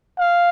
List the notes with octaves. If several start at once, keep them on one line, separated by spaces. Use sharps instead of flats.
F5